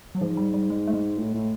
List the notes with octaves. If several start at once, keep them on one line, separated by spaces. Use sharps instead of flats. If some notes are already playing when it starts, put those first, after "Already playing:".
F#3
G#2 F3
G3
G3
G#3
A3
G#3
A2
A2